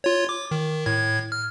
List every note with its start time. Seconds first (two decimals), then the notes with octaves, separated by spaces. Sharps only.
0.04 F4 C#5
0.29 D6
0.51 D#3
0.86 A2 G#6
1.32 F6